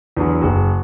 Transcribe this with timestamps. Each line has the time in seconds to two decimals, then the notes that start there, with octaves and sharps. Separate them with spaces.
0.17 E2 D3 F#3
0.42 F#1 F#4